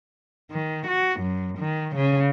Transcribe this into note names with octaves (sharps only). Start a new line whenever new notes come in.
D#3
F#4
F#2
D#3
C#3